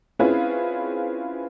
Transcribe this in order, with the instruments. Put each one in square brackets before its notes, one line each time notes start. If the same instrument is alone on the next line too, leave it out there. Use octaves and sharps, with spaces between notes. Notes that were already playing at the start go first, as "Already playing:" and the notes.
[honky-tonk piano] C4 C#4 E4 F4 G#4 B4